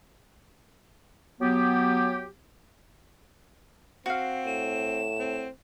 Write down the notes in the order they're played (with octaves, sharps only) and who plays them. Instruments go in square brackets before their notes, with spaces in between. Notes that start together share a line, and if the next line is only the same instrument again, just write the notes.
[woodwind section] F#3 B3 G4
[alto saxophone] C4 [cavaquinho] F#4 F5
[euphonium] A2 [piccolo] E7
[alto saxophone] C4